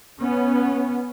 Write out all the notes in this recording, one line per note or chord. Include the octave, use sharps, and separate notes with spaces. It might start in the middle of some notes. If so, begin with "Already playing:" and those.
B3 C#4